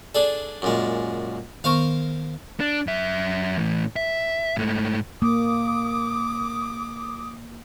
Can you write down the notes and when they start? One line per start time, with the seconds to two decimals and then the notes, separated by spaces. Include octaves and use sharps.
0.15 D4 G#4 A4 D5
0.62 F#2 A#2 G#3
1.64 D#3 B3 A#4 C5 F5 C#6
2.60 D4
2.87 F#2 E5
3.58 A2 E3
3.96 E5
4.57 G#2 A3
5.22 A#3 D6 D#6